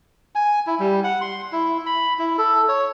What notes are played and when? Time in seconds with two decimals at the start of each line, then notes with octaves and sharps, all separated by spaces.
0.35 G#5
0.67 E4
0.80 G3
1.04 F#5
1.21 C6
1.52 E4
1.86 B5
2.19 E4
2.38 A4
2.68 C#5